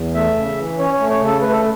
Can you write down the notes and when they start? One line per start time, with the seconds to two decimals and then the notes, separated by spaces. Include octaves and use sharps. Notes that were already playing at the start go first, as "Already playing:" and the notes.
Already playing: E2
0.14 A3 E5
0.36 C#3
0.57 E3
0.79 C#4 C#5
0.94 C#5
1.00 A3
1.10 C#5
1.21 C#3
1.26 A4
1.42 A3 B4
1.52 A4